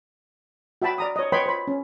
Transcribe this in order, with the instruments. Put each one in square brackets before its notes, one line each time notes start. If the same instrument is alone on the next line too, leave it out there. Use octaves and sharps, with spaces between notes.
[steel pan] F#4 E5 G5 A5 B5
D5 A#5 D#6
C#5 D#5
B4 C#5 D#5 G5 B5 C6
C5 B5
C#4